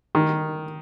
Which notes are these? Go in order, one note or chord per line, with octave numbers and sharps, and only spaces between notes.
D#3